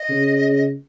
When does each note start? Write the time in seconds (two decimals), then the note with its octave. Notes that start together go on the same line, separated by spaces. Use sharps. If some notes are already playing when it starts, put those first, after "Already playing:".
Already playing: D#5
0.09 C#3